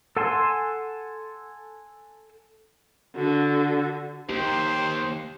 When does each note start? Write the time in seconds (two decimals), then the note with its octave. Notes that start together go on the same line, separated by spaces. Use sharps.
0.17 A4 F#5 G#5 A5 C6
3.16 D3 F#4
4.29 D#2 G4 C5